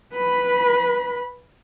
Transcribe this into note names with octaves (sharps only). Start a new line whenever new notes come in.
B4 B5